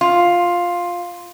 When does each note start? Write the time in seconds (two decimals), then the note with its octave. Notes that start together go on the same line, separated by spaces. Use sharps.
0.01 F4